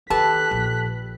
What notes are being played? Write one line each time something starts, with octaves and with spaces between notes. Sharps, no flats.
D#3 G4 A4 B4 A5 F#6 B6
A#1